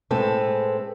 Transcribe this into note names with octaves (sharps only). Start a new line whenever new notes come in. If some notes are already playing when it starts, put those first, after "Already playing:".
A2 G#3 C4 A4 B4